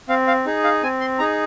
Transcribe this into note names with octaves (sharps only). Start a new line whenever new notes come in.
C4 F5
F5
D#4 G#4
F5
C4 G#5
C6
D#4 G#4 A#5